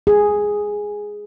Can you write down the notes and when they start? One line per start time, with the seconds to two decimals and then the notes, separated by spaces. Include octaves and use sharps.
0.07 G#4